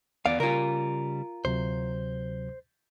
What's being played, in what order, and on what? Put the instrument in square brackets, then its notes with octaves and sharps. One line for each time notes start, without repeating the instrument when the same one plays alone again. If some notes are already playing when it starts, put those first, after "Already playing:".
[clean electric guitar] E2 F5 [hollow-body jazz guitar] B3 D5
[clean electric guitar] C#3 G3 [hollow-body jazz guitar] F4 A#4
[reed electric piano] D2 C3 F#3 [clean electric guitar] C5